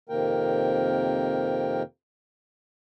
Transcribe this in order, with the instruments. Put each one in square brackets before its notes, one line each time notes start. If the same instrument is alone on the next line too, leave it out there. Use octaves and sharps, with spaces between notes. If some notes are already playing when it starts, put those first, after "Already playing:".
[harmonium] F2 C3 D#3 A#3 A#4 G5